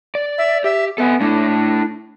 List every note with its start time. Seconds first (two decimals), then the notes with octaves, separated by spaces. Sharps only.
0.15 D5
0.38 E5
0.64 G4 E5
0.98 B3 A4 E5 G#5
1.21 A3 D4 E4